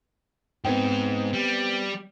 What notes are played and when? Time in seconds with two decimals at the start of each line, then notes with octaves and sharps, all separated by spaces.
0.65 G#2 B3 C4 G5
1.34 G3